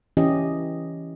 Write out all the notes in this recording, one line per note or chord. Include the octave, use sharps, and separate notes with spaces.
E3 C#4 E4 G4 D#5